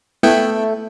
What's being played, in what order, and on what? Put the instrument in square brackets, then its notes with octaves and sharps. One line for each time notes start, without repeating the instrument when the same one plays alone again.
[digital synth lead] A3 [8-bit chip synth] B3 E4 G5